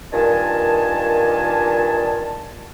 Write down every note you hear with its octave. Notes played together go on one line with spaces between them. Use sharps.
G2 A#2 D#3 D#5 G#5 A5